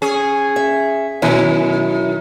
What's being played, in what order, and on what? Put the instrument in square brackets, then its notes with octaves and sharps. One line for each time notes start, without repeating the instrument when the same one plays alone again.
[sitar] C#4 G#4
[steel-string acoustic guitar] E5
[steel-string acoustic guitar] F#2 B2 E4 [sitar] D#3